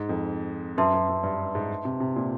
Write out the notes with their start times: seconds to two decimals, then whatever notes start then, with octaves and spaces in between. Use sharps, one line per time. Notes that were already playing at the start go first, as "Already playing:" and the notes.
Already playing: G#2 D#4
0.09 F2
0.78 F#2 B4 E5 A5 C6
0.94 F#2
1.09 F#2
1.23 G2
1.55 G#2
1.85 C3
2.00 C3
2.16 A#2